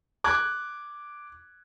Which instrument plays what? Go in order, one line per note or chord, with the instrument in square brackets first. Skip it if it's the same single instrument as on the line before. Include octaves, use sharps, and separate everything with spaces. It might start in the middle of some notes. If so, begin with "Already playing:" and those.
[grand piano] D6 F#6 G#6